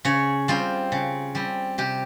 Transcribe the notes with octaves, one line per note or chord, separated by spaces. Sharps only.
C#3 C#5
G3 C4 F4
C#3
G3 C4
C3 G4